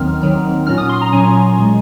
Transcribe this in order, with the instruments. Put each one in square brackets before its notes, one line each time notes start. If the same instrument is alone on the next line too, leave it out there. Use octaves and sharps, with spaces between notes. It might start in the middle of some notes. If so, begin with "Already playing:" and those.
Already playing: [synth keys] D#2 D#3 F#3 C4 D#4 F6
D#2 D#3 F#3 C4 D#4
A#2 F#3 C#4 F6
D#6
C6
A#5
A#2 F#3 C#4 G#5
A#2 G#3